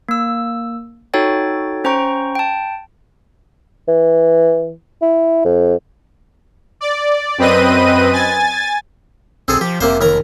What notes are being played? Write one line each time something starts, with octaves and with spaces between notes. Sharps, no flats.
A#3 E6
D#4 F#4 A4 C#5 G5 A6
C#4 C5 G5 A#5 C#6
G5 A5
E3
E4
F2
D5
F#2 C4 B4 D#5 D#7
G#5 A6
B1 C4 G#4 A4
F3 G4
F1 C3 A#3 C5
D#2 A#4 A#5